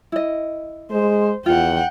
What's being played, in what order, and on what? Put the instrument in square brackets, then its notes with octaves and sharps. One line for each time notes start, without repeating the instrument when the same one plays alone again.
[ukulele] E4 D#5
[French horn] G#3 [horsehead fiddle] C5
[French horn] E2 [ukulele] F4 [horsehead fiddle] F#5 G5